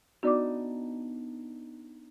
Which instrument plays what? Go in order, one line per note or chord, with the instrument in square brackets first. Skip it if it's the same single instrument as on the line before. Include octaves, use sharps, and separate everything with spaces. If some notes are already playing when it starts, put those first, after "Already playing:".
[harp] B3 D4 D#4 [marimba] F#4 D5 D6